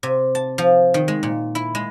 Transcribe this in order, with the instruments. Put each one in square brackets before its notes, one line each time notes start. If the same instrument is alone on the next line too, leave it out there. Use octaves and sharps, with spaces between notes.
[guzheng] C3
A5
F3
D#3
G#3
A#2
E4
G#3